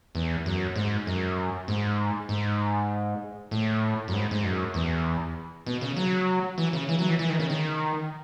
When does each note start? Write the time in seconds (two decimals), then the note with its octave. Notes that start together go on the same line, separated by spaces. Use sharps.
0.15 E2
0.46 F#2
0.76 G#2
1.07 F#2
1.68 G#2
2.29 G#2
3.51 A2
4.08 F#2
4.13 G#2
4.31 G#2
4.43 F#2
4.74 E2
5.66 B2
5.81 C#3
5.97 F#3
6.58 E3
6.73 C#3
6.89 E3
6.99 F#3
7.09 E3
7.19 E3
7.29 D#3
7.39 C#3
7.50 D#3